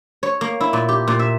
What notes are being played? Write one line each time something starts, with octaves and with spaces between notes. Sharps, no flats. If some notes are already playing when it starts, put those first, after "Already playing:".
C#5
A#3
E4
A#2
G4
A#2
E5